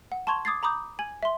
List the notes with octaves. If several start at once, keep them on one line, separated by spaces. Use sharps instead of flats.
F#5
A5 C6 C#6 G#6 F7 G7
D6 D#6 G#6 A6 C7
A#5 B5 D6 D#6 G6
G#5 G#6 F#7
E5 C6